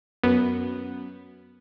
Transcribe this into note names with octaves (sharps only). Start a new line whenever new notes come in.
F#2 B3